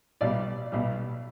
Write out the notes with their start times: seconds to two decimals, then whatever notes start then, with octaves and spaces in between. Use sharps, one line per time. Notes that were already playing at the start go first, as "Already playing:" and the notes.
0.21 B1 B2 G3 D5
0.72 B1 B2 G3